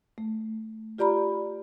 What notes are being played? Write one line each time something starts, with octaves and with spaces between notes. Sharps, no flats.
A3
F4 G4 D5 A#5 B5